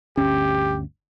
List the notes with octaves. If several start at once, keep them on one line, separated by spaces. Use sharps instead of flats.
G1 D2 C#4 G4